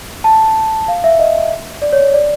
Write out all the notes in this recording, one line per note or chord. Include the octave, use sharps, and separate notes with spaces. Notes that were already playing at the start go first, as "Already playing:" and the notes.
A5
F5
E5
D#5
D5
C#5
D5